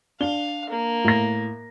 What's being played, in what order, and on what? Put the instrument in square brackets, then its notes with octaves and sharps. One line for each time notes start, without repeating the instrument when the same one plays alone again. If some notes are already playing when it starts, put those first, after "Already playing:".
[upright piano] D4 G7 [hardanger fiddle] F5
[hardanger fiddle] A#3
[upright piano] A2 A#6